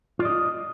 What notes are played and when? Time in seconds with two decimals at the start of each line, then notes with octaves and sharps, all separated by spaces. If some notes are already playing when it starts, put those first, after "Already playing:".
0.19 F4
0.22 D5
0.25 D#5